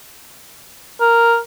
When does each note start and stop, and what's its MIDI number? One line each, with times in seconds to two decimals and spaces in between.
1.01 1.38 70